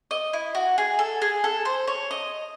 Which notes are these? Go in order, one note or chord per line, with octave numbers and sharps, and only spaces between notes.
D#5
E4
F#4
G#4
A4
G#4
A4
C5
C#5
D#5